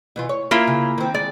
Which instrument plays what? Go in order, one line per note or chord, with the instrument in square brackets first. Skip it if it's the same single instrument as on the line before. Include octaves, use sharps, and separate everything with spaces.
[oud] B2 E3 F4
C#5
[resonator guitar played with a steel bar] A#3 E4 F4
[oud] C#3
D#3 C4
[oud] G#3 [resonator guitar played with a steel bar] D5